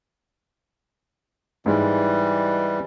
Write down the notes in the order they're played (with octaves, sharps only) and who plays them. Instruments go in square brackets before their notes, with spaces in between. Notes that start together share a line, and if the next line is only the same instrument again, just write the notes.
[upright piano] G#2 G#3 [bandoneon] E3 G3